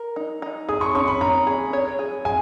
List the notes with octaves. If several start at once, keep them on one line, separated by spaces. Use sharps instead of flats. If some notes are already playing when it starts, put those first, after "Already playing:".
Already playing: A#4
D#4
D#4
G#4 D#6
C#6
C#4 C#6
B5
C#4 A#5
G#4
C#5
G#4
G#4 G#5